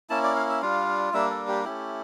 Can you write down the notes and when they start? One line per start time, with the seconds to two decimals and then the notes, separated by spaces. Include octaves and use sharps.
0.10 A#3 C#4 E4 A5
0.23 D5
0.36 F5
0.49 E5
0.62 G3 D4 F4 F5
1.13 G3 A#3 D4 E5
1.30 A4
1.48 G4
1.65 A3 C#4 E4 G4